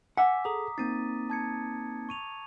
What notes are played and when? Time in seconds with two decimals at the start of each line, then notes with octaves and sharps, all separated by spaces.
0.17 F#5 G#5 D6 E6 B6
0.45 G#4 A4 A#5 D#6
0.78 A#3 C4 D#4 A6 D#7
1.30 A5 G#6 C#7
2.09 C#6 D#7 F7